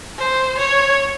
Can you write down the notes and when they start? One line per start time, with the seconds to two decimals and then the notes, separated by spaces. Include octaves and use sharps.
0.18 C5
0.58 C#5